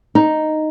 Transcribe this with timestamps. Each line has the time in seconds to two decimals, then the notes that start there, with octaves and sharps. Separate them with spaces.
0.15 D#4